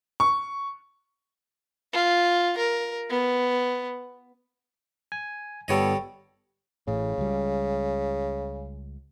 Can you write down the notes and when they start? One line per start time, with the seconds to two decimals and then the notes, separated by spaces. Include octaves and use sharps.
0.20 C#6
1.93 F4
2.57 A#4
3.10 B3
5.12 G#5
5.68 G1 G3 B3 A4 C#5 D#5
6.87 A1 A2 C#3
7.18 C#2 G3